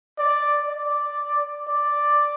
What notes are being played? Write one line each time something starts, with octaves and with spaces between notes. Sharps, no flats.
D5
D5
D5